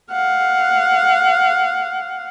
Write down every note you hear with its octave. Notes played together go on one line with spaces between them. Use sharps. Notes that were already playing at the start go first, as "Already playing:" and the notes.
F5 F#5